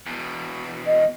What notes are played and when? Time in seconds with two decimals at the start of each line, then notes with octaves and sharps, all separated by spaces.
0.06 E2 B2
0.85 D#5